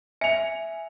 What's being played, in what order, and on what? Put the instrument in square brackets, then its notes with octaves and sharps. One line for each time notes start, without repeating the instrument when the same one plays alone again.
[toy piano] E5 [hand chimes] G#5 [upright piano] C#7 F7